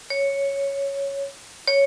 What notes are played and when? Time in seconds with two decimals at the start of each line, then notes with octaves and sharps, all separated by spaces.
0.10 C#5
1.67 C#5